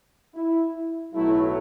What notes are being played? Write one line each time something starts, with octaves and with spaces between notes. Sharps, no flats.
E4
B1 A2 F#3 A3 E4